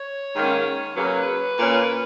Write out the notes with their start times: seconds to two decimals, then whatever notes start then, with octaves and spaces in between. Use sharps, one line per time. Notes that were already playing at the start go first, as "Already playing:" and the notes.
Already playing: C#5
0.34 G#2 D#3 A#3 C#4
0.95 C#3 F#3 A#3 C#4 B4
1.57 A#2 A#3 C#4